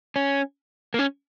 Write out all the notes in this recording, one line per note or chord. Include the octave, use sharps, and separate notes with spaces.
C#4
A#3
C#4